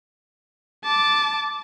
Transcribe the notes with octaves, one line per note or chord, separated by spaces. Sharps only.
A5 D6